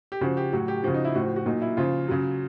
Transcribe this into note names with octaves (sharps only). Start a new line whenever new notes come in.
G4
C#3 F3 F#4
G4
A2 F#3 F#4
G4
C#3 F3 F#4
D#4
E4
A2 F3 F#4
F#4
F#4
A#2 F#3 D#4
E4
C#3 F3 F4
C#3 F#3